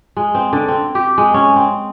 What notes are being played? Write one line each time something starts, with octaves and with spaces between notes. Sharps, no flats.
G#3
C4
D3
C4
G4
G#3
C#4
C4